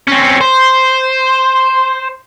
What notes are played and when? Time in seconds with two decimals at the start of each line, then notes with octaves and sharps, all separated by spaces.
0.08 C4 C#4
0.41 C5